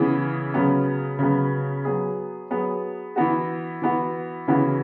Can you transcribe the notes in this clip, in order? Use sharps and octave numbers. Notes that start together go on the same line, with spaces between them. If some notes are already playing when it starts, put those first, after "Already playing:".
Already playing: C#3 E3 B3 G#4
C#3 F#3 B3
C#3 F#3 B3
F#3 B3 G#4
F#3 B3 G#4
E3 B3 F#4
E3 B3 F#4
C#3 E3 B3 F#4